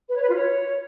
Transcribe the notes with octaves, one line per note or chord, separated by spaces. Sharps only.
B4
C#5
B4
F4
C#5